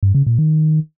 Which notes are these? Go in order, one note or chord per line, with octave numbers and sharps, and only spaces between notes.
G2
C#3
A#2
D#3